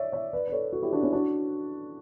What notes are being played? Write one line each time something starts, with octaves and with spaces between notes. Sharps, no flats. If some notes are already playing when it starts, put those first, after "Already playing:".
Already playing: C#5 D5 E5
C#5 E5
B4 D5
D5
A4 C#5
F#4 A4
E4 G4
D4 F#4
C#4 E4
D4 F#4